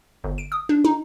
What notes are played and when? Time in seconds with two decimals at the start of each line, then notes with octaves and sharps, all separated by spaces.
0.24 G1
0.38 D7
0.52 D#6
0.69 D4
0.84 D#4